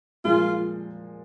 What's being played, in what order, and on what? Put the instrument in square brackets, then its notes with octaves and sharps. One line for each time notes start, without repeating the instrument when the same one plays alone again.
[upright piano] A#2 F3 G#3 [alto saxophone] F4